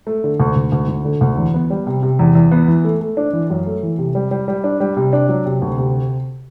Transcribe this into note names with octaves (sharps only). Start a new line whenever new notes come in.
A3
D3
D2
D2
D2
D2
D3
D2
E2
B3
G3
C3
C3
E2
E2
B3
E3
A3
A3
D4
E3
F#2
A3
E3
C3
G3
G3
G3
D4
G3
C3
D4
F#3
C3
D2
C3